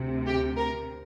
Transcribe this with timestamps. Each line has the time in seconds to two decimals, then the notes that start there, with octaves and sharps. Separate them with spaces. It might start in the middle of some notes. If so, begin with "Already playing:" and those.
Already playing: D2 C3
0.26 G4
0.57 A#4